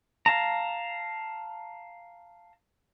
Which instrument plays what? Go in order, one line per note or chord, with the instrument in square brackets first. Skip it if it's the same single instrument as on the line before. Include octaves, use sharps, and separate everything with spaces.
[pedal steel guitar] F5 A5 A#5